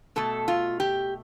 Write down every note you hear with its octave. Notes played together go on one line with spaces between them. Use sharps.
B2 A3 A4
F4
G4